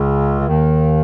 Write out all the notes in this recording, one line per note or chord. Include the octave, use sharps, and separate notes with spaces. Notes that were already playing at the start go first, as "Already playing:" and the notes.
Already playing: C#2 C#3
C#3
D#2 D#3